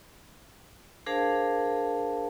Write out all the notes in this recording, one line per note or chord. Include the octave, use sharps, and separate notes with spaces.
D4 G#4 A#4 C5 F5 A5